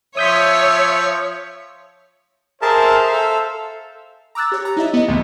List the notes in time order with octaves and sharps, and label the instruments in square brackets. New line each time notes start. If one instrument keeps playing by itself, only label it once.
[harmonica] F3 [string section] C#5 [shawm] E5 [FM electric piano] D#6 G6 B6
[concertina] G#4 A#4 A5 [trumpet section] C5 E5 F5
[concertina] A4
[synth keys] A#5 D6 E6 F#6 A6
G4 C#5
A#5
D#4 E4 D#5 E5
B3 D#5
C#2 A2 D3 F3 A3 B3